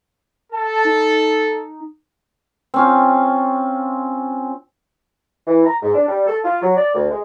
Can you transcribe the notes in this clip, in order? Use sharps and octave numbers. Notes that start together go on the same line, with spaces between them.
A4 A5
D#4
C4 C#4 F4
E3
A#5
G#2
D4
G3
A4
F4
F#3
D5
D2
G#3